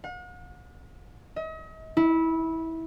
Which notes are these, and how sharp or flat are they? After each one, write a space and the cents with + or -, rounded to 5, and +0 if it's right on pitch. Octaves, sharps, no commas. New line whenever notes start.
F#5 -45
D#5 +40
E4 -20